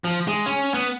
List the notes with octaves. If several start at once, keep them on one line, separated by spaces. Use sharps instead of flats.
F3
G#3
C#4
B3